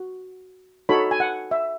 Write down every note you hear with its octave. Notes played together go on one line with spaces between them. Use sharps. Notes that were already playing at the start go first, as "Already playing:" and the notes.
Already playing: F#4
D#4 F#4 A4 C#5 B5
G#5
F#5
E5